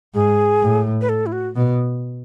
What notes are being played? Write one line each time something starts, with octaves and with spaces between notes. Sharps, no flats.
G#2 G#4
A2
B4
A4
E4
F#4
B2